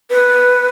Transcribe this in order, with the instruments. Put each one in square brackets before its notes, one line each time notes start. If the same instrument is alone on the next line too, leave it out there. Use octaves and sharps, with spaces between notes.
[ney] B4